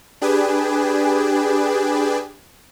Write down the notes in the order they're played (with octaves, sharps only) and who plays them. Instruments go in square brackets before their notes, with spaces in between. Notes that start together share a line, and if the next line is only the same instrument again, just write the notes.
[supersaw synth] D4 G4 G#4 B4 G#5